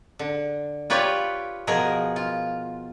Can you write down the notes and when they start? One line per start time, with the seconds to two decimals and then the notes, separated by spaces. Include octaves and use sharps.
0.19 D3
0.90 F4 G4 B4 C#5 D5 G5
1.67 B2 F3 G#4 A#4
2.16 F4